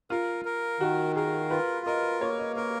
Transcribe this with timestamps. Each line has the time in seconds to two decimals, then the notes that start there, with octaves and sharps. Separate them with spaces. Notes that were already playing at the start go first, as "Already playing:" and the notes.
0.10 F4 A#4
0.45 A#4
0.80 D#3 F#4
1.16 G#4 A#4
1.50 F4 B4
1.86 A#4 D#5
2.21 A#3 C#5
2.39 D#5
2.56 A#4 F5